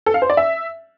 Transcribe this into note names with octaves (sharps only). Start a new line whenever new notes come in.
A4
F5
C5
D5
E5